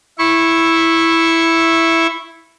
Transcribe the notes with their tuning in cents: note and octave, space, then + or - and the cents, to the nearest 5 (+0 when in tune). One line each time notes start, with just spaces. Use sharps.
E4 +0 C#6 -20